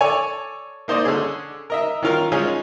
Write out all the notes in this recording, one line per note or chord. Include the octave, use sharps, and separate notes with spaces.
A4 C#5 D5 G#5
A#3 D#4 C5 D5 D#5
D3 C#4 G#4
A#4 D#5 E5
D#3 C#4 F4 A#4 F6
G#3 C#4 D#4 F4 G#4